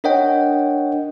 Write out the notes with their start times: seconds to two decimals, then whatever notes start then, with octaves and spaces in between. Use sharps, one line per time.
0.04 D4 A#4 C#5 D#5 F#5 G5